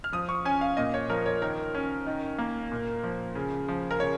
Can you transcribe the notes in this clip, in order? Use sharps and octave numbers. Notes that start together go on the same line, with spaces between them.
F6
F3 D#6
C#6
C#4 G#5
F5
A#2 D#5
C#5
F3 A#4
C#5
D#3 A#4
C#4
D#3
A#3
A#2
F3
C#3
F3
A#4
C#3 C#5